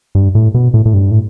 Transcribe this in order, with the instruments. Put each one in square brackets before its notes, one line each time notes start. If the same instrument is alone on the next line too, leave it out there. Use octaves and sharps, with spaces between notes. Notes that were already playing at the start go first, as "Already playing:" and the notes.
[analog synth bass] G2
A2
B2
A2
A2
G2
A2